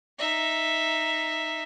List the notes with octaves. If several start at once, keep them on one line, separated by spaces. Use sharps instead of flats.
D#4 E5